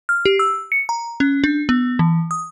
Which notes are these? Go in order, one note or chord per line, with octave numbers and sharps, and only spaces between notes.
F6
G4
E6
C#7
A#5
C#4
D4
B3
E3
D#6